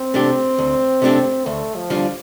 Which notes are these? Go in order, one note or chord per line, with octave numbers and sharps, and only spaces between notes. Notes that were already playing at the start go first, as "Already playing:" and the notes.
Already playing: C4
C3 A3 D4 G4
D2
C3 A3 D4 G4
D2 A3
F3
D3 G3 F4